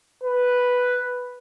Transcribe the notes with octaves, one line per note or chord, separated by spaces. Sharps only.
B4